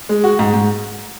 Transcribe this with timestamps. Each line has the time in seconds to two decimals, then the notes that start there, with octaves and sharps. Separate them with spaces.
0.09 G#3
0.24 F#4
0.39 G#2
0.54 G#2